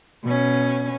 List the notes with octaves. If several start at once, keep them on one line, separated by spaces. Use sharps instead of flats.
B2 C#4